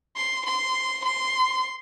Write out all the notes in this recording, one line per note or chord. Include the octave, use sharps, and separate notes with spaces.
C6
C6
C6